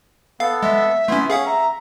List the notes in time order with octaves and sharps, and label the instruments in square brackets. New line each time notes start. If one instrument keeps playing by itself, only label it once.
[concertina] B3 A4 [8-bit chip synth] F5
[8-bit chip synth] G#3 [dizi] E5
[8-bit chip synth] A3 C#4 [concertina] B3 E4 C6
[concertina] C#4 [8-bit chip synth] G#4 F5 F#5
[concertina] E5 [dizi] A#5